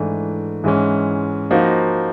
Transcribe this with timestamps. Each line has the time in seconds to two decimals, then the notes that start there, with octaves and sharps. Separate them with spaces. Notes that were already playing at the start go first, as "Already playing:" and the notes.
Already playing: G#2 E3 A3 D4
0.64 G#2 E3 G#3 C#4
1.51 F3 A#3 D#4 F#4 A#4